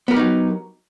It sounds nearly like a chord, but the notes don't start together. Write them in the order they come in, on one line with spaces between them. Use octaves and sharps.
B3 A#4 G4 D#4 F#3